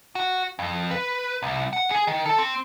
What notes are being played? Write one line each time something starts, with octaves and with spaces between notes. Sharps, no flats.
F#4
F2
B4
C2
F#5
G#4
D#3
A4
C4